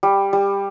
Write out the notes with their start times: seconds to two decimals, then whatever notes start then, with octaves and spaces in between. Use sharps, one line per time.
0.03 G3
0.33 G3